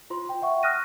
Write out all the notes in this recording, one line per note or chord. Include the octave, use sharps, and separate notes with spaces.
F4 C5 C6
G5
E5 F#5 C#6
D#6 F6 F#6 A#6 D#7